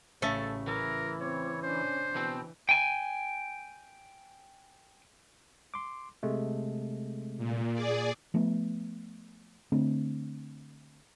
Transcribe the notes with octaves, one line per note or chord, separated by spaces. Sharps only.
A1 C#3 A3 A4
E3 A#4
C4 C#5
C#4 D4 C5
B2 E3 C4
G5 G#5
C6 D6
C3 G#3 A3
A#2
G#4 D5
F3 A3 B3
D3 A3 C4